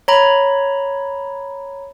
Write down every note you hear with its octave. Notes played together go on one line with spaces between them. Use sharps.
C#5 A#5 B5